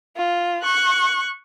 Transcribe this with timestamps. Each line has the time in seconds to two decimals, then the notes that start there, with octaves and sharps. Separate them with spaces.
0.17 F4
0.62 C#6 F#6